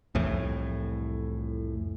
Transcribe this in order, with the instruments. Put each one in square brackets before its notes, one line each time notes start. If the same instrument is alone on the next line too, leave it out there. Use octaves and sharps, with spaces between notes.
[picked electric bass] C2 F2 A2 E3